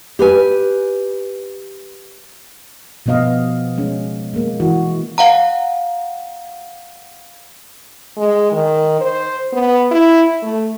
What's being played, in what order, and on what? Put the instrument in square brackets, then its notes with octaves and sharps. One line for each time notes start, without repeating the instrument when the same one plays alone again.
[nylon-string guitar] G4 B4 G#5
[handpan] B2 F3 B3 D#5 F5
G#3 C#4
G#3 A#3
E3 F#4
[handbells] F5 F#5 A#5
[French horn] G#3
D#3
C5
B3
E4
A3